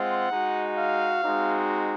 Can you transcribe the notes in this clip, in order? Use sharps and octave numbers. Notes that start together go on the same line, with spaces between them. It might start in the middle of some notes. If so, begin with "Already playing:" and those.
Already playing: G#3 C4 F4 F#5
G#3 D#4 F#4
F5
G#3 C4 D#4 F#4